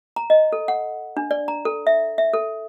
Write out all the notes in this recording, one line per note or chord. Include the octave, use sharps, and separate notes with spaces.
A#5
D#5
A4
F#5
D4
D5
A#5
A4
E5
E5
A4